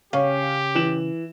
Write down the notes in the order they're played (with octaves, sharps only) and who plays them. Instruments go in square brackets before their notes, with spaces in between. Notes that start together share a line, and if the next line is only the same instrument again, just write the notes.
[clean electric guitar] C#3 [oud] C#4 [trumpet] G4 [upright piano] F5
[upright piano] E3 E7 F#7